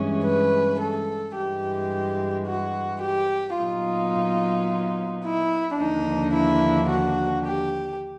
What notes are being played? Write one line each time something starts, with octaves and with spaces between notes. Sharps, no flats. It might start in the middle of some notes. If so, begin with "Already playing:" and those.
Already playing: G2 E3 G#3 C#4
B4
A4
G2 E3 G#3 G4
F#4
G4
A#2 F#3 B3 D#4 F4
E4
D#2 D3 F3 A#3 D4 D#4
E4
F#4
G4